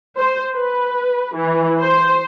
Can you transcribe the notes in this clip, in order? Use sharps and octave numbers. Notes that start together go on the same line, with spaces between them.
C5
B4
E3
C5